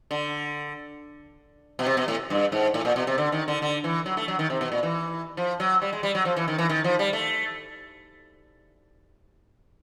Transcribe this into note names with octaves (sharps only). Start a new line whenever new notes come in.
D3
B2
C3
B2
A2
G2
G#2
A2
A#2
B2
C3
D3
D#3
D3
D3
E3
F#3
A3
F#3
D#3
C3
B2
A#2
E3
F3
F#3
G3
G#3
G3
F#3
F3
E3
D#3
E3
D#3
F3
G3
A3